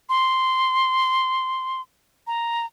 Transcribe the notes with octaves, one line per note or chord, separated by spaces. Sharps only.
C6
A#5